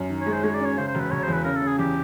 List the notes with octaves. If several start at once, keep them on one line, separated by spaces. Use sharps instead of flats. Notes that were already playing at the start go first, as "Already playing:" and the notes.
Already playing: F#2
D#3
G#3 C#5
C5
G#3 C#5
D5
C#4
C#5
C#3 C5
C5
E1
B4
E1 C#5
E2 C5
B4
C#3 A#4
A4
C#3
G#4
E2 G4